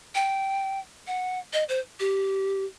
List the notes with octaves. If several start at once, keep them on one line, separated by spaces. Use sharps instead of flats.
G5
F#5
D#5
C5
G4